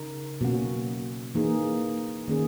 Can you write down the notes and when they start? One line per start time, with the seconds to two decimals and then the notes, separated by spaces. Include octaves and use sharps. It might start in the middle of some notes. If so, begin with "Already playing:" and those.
Already playing: C#3 D#4 A#4
0.41 B2 F#3 A#3 C#4 F#4
1.35 E3 A#3 D#4 G#4
2.28 D#3 A#3 C#4 G#4